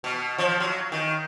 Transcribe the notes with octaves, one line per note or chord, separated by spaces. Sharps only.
B2
F3
F#3
D#3